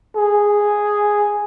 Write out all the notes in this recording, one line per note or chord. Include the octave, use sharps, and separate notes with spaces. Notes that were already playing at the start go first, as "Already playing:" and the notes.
G#4